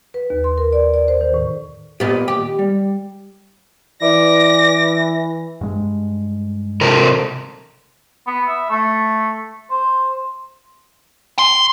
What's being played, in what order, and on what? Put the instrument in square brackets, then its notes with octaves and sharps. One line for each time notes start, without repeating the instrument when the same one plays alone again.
[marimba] B4
D#2
C6
A#4
D5
D5
C5
D#3
A2
[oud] A#2 B3 [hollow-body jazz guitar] G4 D#5
[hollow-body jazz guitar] D#2 [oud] G4
[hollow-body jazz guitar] G3
[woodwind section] E3 [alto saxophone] D5 [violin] A#6
[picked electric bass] G2 G#3
[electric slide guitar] C3 A4 A#4
[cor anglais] B3
E5
A3
C5
[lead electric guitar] C6